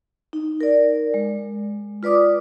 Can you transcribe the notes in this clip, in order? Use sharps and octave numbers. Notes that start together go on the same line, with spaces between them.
D#4
A#4 D5
G#3
F4 B4 D5 D6 D#6